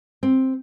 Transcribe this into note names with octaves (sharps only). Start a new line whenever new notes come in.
C4